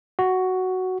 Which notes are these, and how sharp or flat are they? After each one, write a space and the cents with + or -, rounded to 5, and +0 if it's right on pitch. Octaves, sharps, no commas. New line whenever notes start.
F#4 +5